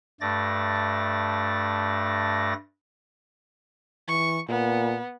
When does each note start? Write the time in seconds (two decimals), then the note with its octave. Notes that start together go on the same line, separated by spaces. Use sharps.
0.21 G2 A3 D5 A6 A#6
4.08 E3 C#6
4.49 A#2 B3